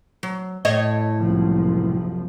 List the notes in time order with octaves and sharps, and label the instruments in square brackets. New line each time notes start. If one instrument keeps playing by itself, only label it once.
[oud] F#3
A2 C#5 D#5
[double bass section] F#1 C2 F3